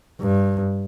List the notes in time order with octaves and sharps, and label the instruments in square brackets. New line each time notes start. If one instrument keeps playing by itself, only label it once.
[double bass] G2